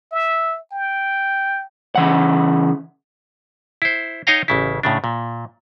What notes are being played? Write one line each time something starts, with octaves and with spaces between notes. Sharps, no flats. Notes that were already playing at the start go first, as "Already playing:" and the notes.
E5
G5
C#3 E3 F#5
E4 C5
D#4 C#5 D#5 F5 G5 A#5
A1 C#3 E4
A2 C#3 D4
A#2